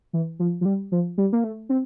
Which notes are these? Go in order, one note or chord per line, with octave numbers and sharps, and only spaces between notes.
E3
F3
F3
G3
F3
G3
A#3
A3
C4